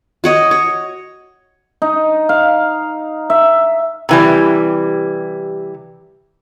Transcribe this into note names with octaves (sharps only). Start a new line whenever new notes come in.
F#4 C#5 D#5
C#5
D#4
F5
E5
C3 E3 G3